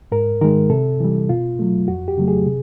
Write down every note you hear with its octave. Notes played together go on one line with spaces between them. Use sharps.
G#2 A#4
D#3 G#3 A#4
C3 A4
E3 G3
B2 F4
F#3 A3
F2 F#4
G4
C#3 F#3 A3
G#4
C3